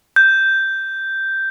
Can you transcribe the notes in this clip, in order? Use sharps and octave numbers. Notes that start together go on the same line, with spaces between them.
G6